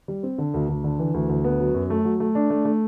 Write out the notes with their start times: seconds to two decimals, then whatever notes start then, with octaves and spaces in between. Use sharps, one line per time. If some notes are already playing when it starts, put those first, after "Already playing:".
0.08 G3
0.23 C4
0.38 D3
0.54 D2
0.69 D2
0.84 D3
0.99 E3
1.14 D2
1.29 D2
1.44 B3
1.59 F#3
1.74 F#2
1.90 A3
2.05 F#3
2.20 A3
2.35 D4
2.50 A3
2.65 A3